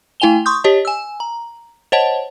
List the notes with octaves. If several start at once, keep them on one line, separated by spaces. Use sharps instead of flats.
A3 E4 G5 G#5 F7 G7
C6 C#6 D#6 G6
G4 C#5 D#5 A5
G#5 E6
A#5
C5 C#5 D#5 F#5 A5